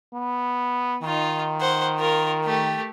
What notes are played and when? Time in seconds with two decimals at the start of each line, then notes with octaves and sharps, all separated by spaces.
0.14 B3
1.03 D#3 D#4 F4
1.60 C5 F#5
1.99 F4 A#4
2.44 A3 G4